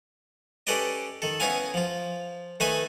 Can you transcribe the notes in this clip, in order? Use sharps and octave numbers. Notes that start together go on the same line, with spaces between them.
C#4 G4 A4 B4 D5 D#5
D#3 A4
B3 C#4 D#4 E4 F5 G#5
F3 F4
D#3 A3 D#4 B4 E5 G#5